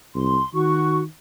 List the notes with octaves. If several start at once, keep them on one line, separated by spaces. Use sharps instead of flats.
C2 C6
D#3 F#4 C#6